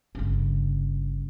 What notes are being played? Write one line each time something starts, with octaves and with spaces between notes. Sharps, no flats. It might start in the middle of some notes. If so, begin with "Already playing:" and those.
G1 C#3